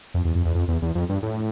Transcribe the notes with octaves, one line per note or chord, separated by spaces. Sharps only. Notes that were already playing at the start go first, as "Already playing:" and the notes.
F2
E2
F2
E2
F2
E2
E2
F2
G2
A2